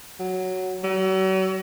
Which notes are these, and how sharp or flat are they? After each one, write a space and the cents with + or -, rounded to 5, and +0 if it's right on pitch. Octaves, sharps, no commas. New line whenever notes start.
F#3 +5
F#3 +40